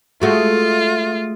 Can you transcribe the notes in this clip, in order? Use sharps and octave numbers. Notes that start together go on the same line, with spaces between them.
G#3 A3 F4 F#4